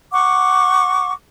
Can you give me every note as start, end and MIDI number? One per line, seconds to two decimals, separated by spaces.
0.12 1.12 78
0.12 1.12 85
0.12 1.12 86